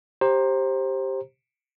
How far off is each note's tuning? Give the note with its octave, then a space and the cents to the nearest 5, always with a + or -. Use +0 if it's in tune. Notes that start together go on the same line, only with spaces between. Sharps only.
G4 +0 C5 +20 A#5 +0